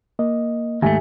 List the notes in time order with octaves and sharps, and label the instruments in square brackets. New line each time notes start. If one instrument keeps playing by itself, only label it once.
[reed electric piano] A#3 D#5
[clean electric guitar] D#2 G#2 A3 [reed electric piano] G4 E5 G#5